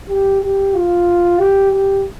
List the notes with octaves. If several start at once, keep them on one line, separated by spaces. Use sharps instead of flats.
G4
G4
F4
G4
G4